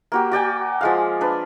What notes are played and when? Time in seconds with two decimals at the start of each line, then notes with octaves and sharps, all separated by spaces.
0.12 A#3 F#4 G4
0.31 F#4 D5 G5 G#5
0.81 F3 G#3 F5
1.21 D4 B4